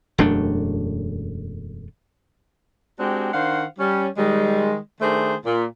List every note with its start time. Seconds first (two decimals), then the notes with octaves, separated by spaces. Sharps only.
0.18 E1 F#2 A3 D4
3.00 G#3 C4 D4 F#4 G4
3.33 D#3 D4 C5 F5 F#5
3.79 G3 C#4
4.17 D#3 G3 G#3
5.01 D#3 A3 D4 G#4 C5
5.45 A#2